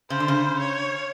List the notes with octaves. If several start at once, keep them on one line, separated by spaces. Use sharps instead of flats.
C#3 C5
D3
C#3
C#5